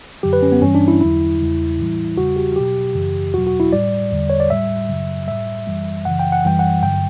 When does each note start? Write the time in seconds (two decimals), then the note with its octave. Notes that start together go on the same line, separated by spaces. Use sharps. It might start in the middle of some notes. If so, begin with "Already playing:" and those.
0.23 F#2 D3 F#3 G4
0.33 B4
0.42 C#4
0.52 B3
0.62 G2 E3 G3 C#4
0.75 D4
0.88 E4
1.01 E2 D3 F#3 E4
1.39 E2 C#3 G3
1.78 A2 E3 G3
2.17 E2 C#3 G3 F#4
2.36 G4
2.52 F#4
2.56 B2 F#3 G4
2.95 F#2 C#3 E3
3.34 E2 B2 F#3 F#4
3.47 F#4
3.60 E4
3.73 A2 G3 D5
4.11 E2 D3 G3
4.30 C#5
4.40 D5
4.50 A2 G3 E5
4.89 F#2 C#3 F#3
5.28 A2 G3 E5
5.67 F#2 E3 G3
6.05 F#2 C#3 E3 F#5
6.19 G5
6.32 F#5
6.45 F#2 E3 G3 G5
6.59 F#5
6.83 G2 D3 F#3 G5